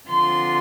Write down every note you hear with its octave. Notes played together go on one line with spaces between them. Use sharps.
D3 F3 C4 F4 C6